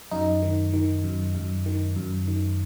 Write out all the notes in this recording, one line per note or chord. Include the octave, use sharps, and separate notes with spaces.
F#2 D#4
D#3
D#3
F#2
F#2
D#3
F#2
D#3